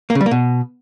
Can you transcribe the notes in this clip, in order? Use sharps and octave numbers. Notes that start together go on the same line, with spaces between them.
A#3
C#3
G3
A#3
B2